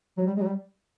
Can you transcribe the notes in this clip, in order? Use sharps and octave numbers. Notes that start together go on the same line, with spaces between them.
F#3
G3
G#3
F#3
G3